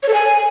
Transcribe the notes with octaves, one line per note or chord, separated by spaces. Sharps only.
C#5
A4
G#5